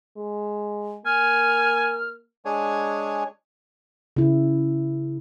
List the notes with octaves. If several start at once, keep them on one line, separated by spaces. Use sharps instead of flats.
G#3
A#3 G#5 F6
G#3 D4 G#4 C#5 G#5
C#3 E4